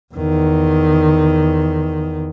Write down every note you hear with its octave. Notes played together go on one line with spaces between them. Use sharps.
E2 D#3